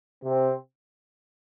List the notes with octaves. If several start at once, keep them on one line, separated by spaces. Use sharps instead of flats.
C3 C4